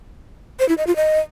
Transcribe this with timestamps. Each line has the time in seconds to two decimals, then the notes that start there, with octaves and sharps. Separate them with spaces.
0.59 C5
0.69 E4
0.78 D#5
0.87 F4
0.96 D#5